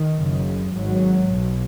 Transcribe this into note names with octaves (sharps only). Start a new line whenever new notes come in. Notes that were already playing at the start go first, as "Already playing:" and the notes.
Already playing: D#3
F#1 F#2 C#3
G#1 G#2 F#3
B1 B2